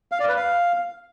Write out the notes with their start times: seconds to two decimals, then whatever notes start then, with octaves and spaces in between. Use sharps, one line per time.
0.12 F5
0.20 D5
0.28 B4
0.37 F5